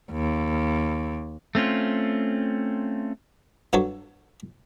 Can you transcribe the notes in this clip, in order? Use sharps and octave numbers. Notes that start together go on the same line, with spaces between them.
D#2
A3 C4 C#4 F4
G2 F#3 F#4 A4 C#5